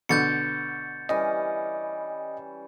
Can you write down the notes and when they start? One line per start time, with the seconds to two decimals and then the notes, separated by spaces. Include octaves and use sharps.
0.09 B2 D3 G6 A6 C#7
1.09 E3 G3 C#4 D#5